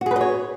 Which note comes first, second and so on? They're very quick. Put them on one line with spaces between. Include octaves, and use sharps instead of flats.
F#4 G#4 B4 D#5 C#5